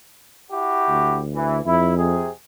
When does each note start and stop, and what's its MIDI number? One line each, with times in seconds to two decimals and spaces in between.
0.51 1.20 64
0.51 1.20 66
0.51 1.20 67
0.88 1.63 38
1.34 1.57 52
1.65 2.28 41
1.65 1.95 64
1.98 2.29 48
1.98 2.29 68